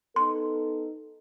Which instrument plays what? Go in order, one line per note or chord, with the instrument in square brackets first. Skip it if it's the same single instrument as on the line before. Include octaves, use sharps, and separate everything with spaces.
[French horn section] B3 D#4 A4 [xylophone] C6